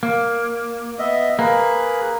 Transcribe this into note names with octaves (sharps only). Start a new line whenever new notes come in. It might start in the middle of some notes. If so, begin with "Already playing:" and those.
A#3
B3 D#5 E5
A#3 G#4 B4